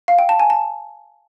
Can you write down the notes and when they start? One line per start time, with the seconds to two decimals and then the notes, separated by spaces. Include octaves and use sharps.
0.08 F5
0.19 G5
0.29 A5
0.40 G#5
0.50 A5